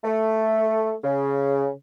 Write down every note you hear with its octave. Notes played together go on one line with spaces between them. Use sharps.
A3
C#3